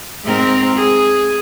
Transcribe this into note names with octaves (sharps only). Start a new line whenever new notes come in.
G#2 C4 A#4
G#4